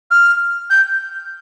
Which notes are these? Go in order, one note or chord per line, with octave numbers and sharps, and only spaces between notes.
F6
G6